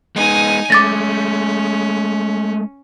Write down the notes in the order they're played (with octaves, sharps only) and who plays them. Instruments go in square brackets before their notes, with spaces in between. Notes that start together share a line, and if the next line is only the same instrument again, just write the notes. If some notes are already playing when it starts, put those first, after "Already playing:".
[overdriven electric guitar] G#3 B3 [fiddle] D#4 G#5
[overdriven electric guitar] G#3 A3 [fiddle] C#4 [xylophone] D6 A6 A#6